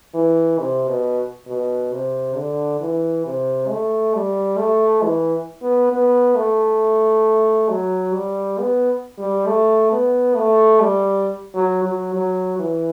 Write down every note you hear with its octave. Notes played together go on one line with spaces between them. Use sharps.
E3
C3
B2
B2
C3
D3
E3
C3
A3
G3
A3
E3
B3
B3
A3
F#3
G3
B3
G3
A3
B3
A3
G3
F#3
F#3
F#3
E3